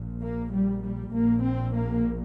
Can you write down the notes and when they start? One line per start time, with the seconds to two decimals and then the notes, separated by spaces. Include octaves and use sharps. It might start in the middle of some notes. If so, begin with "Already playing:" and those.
Already playing: A#1 A#2
0.21 A#3
0.51 G3
0.81 G3
1.12 A#1 A#2 A#3
1.42 C4
1.72 A#3